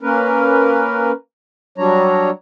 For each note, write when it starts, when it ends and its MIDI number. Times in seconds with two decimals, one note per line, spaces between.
0.01 1.12 58
0.01 1.12 61
0.01 1.12 70
0.01 1.12 71
1.78 2.30 54
1.78 2.30 55
1.78 2.30 62
1.78 2.30 73
1.78 2.30 82